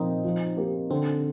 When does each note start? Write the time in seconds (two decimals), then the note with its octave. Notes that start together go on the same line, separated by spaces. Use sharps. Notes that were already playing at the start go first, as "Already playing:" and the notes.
Already playing: A#2 F3 A#3 C4 D#4 F4
0.25 F3
0.57 A#3 D#4 G4
0.90 D3 C4